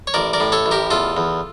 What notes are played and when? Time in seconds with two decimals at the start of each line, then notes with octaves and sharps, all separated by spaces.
0.07 C#5
0.14 A1 A#4 D5
0.33 A#4 D5
0.40 A2
0.52 A4 C#5
0.66 A1
0.71 G4 A#4
0.90 E2 F4 A4
1.17 E2